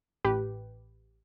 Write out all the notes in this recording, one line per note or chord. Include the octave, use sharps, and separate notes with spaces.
A1 G4 B4